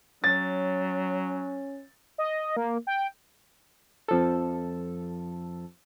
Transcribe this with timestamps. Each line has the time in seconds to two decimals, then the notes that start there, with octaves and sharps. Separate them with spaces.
0.24 F#3 C#4 A6
2.18 D#5
2.57 A#3
2.87 G5
4.08 F2 F3 A4